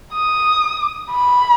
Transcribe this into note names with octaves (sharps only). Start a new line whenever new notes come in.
D#6
B5